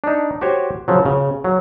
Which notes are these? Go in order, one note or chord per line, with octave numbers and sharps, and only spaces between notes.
D4 D#4
F#4 G4 C5 C#5
C#3 F3 F#3
C#3
F#3